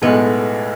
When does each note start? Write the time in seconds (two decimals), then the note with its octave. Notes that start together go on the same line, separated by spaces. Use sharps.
0.02 B1 A2 G#3 B3